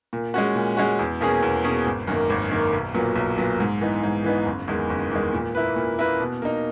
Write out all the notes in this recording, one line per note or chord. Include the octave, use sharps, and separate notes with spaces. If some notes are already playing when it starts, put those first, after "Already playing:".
A#2
G#3 C#4 F#4
A#2
G#3 C#4 F#4
E2
B2 A#3 C#4 G#4
E2
B2 A#3 C#4 G#4
G#1
F#2 D#3 A#3
G#1
F#2 D#3 A#3
B1
A#2 F#3 B3
B1
A#2 F#3 B3
G#2
E3 B3 D#4
G#2
E3 B3 D#4
F#1
E2 D#3 G#3
F#1
E2 D#3 G#3
A#2
A#3 E4 B4
A#2
A#3 E4 B4
B2
A#3 D#4